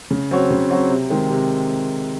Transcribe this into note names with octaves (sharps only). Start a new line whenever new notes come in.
C#3
F#3 C4 F#4 C#5
C#3
F#3 C4 F#4 C#5
C3
D#3 G#3 C4
C3